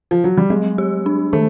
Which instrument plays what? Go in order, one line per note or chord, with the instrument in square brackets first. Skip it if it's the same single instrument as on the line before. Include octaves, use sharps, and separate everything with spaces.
[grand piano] F3
F#3
G3
[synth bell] F#3 [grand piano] G#3
[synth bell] G4
D4
[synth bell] D#3 [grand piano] A3